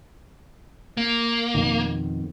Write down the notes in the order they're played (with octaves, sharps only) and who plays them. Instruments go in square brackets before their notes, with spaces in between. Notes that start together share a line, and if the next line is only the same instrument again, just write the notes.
[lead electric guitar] A#3
[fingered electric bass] F2 B2 D#3